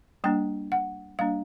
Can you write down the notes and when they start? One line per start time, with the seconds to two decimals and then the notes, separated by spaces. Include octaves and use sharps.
0.24 G3 A#3 D4 G5
0.72 F#5
1.19 G3 A#3 D4 F5